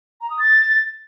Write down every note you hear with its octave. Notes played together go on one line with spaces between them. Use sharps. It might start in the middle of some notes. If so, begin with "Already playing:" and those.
A#5
D#6
A6